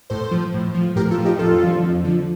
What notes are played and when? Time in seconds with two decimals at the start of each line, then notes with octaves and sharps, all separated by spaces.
0.10 A2 A4 C5
0.31 F3
0.54 A2
0.74 F3
0.96 A2 G4 A#4
1.11 F4 A4
1.18 F3
1.25 D#4 G4
1.39 F2 F4 A4
1.61 D3 F3
1.83 F2
2.05 D3 F3